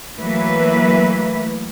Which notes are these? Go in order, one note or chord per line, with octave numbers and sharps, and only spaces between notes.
E3 F#3 A3 A#3 B4 E5